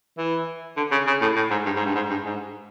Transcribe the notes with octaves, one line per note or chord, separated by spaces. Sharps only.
E3
D3
C#3
C#3
A2
A2
G#2
G2
G#2
G2
G#2
G2
G#2